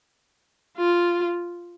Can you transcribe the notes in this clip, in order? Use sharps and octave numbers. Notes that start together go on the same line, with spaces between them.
F4